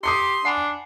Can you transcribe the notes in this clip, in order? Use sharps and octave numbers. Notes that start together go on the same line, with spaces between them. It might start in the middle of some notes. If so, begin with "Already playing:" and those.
G4 C6 D#6 C7 C#7
D4 F#5 G#5 B5